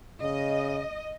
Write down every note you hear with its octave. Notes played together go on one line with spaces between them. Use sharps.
C#3 D#5